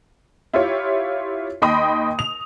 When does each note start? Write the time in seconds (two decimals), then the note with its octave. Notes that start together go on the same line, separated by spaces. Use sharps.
0.54 E4 F4 G4 C#5
1.62 D#2 D#5 G5 B5 C6 D#6
2.19 F7